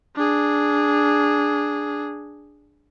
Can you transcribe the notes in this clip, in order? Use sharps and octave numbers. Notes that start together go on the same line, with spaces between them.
D4 G#4